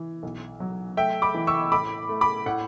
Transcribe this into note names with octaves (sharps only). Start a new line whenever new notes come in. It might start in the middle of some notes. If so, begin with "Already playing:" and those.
Already playing: E3
B1
F#3
A3 E5 G5
B5 D6
E3
C#6 E6
A2 B5 D6
A3
B5 D6
A2 F#5